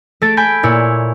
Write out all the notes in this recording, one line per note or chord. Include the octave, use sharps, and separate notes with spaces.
A3 A6 D7
G#5 B5 G6 D7
A#2 E4 C#5